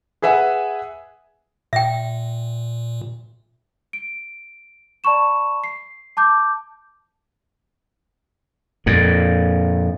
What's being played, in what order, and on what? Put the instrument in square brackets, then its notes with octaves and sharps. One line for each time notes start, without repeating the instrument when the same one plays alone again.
[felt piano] G#4 B4 E5 F#5 G#5
[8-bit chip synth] A#2 [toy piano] E5 G5
[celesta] D7
D5 A5 B5 C#6 E7
C7
A5 D6 G6
[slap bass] F2 A#2